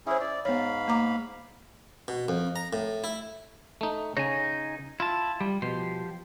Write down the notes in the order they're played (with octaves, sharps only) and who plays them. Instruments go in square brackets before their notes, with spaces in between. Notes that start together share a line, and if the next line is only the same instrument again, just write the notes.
[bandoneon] C#4 E4 G#4 [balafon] C5 E5
[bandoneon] D5
[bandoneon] G#2 F5 B5 [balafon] B3 C#5
[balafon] A#3 A#5 D6
[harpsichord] B2
F2
A#5
A2
E4
[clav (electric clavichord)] A3 D#4
[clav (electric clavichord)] C#3 C#5 [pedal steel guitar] D#4 G#5
[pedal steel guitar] E4 A5 [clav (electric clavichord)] F4
[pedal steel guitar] G3
[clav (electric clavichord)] B2 [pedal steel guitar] F3 G4 C6